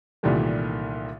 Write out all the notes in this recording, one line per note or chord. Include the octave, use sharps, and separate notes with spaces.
C2 A#2 D#3 E3 G3 A3